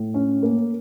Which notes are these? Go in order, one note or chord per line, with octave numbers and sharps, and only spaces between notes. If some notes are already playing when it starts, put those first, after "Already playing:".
Already playing: A2
C#4
A#3